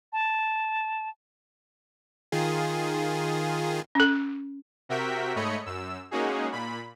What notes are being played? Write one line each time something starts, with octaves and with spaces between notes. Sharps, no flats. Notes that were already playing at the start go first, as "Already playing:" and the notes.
A5
D#3 F4 G#4
C#4 A4
C3 F#4 A#4 E5 G5 B6
G#2 A3 C#5 D#5 B5 C#7
F#2 E6
G#3 A#3 C#4 D#4 F#4 G#4
A#2 B5